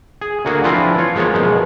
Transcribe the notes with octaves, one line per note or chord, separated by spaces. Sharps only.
G#4
D2 A#3 F#4 G#4
E3 F3 C4 D4 E4 F4
F4 C#5
F3 G#3 A#3 B3 C#5
F#2 B2 F3 G#3